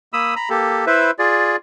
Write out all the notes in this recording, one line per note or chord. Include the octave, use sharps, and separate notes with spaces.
A#3 B5 D#6 E6
A#5 B5
A#3 G4 A4
E4 B4 C5 E5
F4 G#4 D5